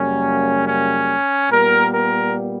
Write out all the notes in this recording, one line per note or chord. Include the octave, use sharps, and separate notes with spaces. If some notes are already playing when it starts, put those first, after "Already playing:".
Already playing: F#2 C#3 G3 A#3 C#4
C#4
A#2 G3 B3 A#4
A#4